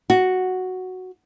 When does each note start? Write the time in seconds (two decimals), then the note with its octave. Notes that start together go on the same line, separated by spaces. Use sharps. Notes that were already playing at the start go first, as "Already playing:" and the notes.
0.10 F#4